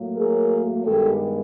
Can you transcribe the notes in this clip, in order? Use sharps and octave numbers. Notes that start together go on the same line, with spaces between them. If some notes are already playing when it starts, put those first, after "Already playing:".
Already playing: A2 F#3 A#3
G#4 A#4
G2 D#3 G#3 B3 G4 A4